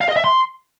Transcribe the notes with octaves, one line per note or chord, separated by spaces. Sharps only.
F5
D#5
E5
C6